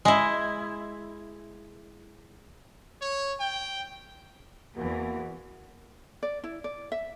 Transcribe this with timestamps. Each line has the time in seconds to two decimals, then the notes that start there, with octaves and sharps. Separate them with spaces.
0.05 G#3 E4
3.01 C#5
3.40 G5
4.76 E2 E3 A#3 F#4
6.23 D5
6.44 E4
6.64 D5
6.92 E5